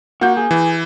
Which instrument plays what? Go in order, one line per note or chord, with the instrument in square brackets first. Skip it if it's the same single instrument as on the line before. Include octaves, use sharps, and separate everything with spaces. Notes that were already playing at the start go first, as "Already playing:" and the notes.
[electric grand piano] A#3 G6 [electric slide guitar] F#4
[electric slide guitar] G#4
[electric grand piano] E3